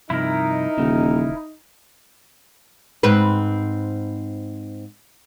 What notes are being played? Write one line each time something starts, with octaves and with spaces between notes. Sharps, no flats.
G2 C3 F3 D#4 E4 A#4
D#1 C#3 E3
G#2 C4 B4